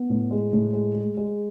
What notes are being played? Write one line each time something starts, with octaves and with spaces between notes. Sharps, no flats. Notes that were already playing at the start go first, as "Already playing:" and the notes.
Already playing: B3
A2
G#3
A2
G#3
G#3
G#3